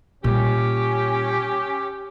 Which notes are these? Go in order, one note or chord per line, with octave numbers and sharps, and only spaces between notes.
A#2 G3 C#4 G4